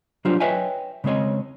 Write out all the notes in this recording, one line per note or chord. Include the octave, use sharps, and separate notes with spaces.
F#3 G3 D4 F4 C5
B4 C#5 D#5 E5 G5 G#5
C#3 G#3 C4 C#5 D#5